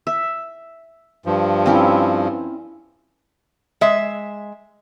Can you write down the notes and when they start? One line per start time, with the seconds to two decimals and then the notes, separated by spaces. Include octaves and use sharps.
0.07 E5
1.26 G2 F3
1.66 C4 C#4 E4
3.81 G#3 E5